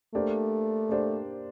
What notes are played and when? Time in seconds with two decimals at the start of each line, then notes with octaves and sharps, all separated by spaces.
0.14 A3 A#3 D4 G4 C5
0.89 A#3 D4 G4 C5